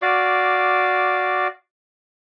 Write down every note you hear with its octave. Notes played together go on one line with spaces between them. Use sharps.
F#4 D5 F5 D6